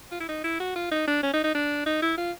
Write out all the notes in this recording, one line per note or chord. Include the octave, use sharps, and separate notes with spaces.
F4
E4
D#4
E4
F#4
F4
D#4
D4
C#4
D#4
D#4
D4
D#4
E4
F4